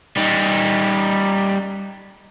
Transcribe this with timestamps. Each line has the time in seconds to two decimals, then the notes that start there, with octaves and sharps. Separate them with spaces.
0.16 G3 D#4